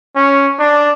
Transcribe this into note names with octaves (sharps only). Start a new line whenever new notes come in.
C#4
D4